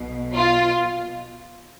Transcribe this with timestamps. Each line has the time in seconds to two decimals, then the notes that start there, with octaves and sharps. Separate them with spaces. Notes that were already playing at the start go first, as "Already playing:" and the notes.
Already playing: B1 B2
0.34 F4